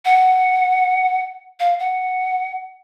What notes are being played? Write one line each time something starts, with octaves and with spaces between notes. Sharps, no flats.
F#5
F5
F#5